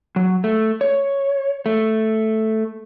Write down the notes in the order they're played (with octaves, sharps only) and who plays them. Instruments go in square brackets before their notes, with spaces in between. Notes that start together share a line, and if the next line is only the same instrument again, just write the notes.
[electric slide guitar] F#3
A3
C#5
A3